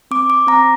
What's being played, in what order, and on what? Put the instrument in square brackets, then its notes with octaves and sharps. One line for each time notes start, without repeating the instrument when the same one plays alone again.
[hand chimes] C4 D6
D6
C4 A#5